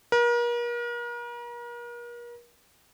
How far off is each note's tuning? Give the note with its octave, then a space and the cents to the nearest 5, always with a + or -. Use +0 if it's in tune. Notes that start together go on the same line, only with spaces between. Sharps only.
A#4 +40